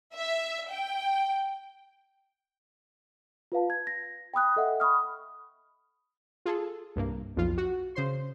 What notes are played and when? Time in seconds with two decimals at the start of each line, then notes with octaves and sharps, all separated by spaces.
0.16 E5
0.70 G5
3.52 F4 B4 F5 A5
3.70 G#6
3.87 A#6
4.34 G5 B5 D#6 F#6
4.56 A4 D#5 E5 F#5
4.80 B5 C#6 D#6 F6
6.46 F4 G#4 A4
6.96 C2 G2 A#3
7.36 B1 F2 F4
7.57 F#4
7.95 C#3 C5 C6